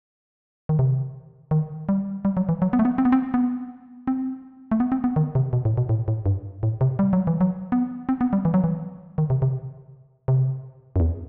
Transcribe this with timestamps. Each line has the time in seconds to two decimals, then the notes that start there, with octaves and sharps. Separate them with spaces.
0.69 D#3
0.79 C3
1.51 D#3
1.89 G3
2.25 G3
2.37 F#3
2.49 E3
2.62 F#3
2.73 B3
2.79 A3
2.85 B3
2.98 C4
3.05 B3
3.12 C4
3.34 B3
4.07 C4
4.71 A3
4.80 B3
4.92 C4
5.04 B3
5.16 D#3
5.35 C3
5.53 B2
5.65 A2
5.77 B2
5.89 A2
6.08 A2
6.26 G2
6.63 A2
6.81 C3
6.99 G3
7.13 F#3
7.27 E3
7.41 F#3
7.72 B3
8.09 C4
8.21 B3
8.33 G3
8.45 E3
8.54 F#3
8.64 E3
9.18 D#3
9.30 C3
9.42 C3
10.28 C3
10.96 F#2
11.00 E2